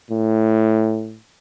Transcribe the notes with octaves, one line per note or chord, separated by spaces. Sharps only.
A2